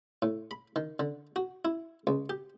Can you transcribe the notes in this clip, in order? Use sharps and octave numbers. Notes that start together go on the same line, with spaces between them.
A2
B5
D#3
D3
F#4
E4
C#2
G4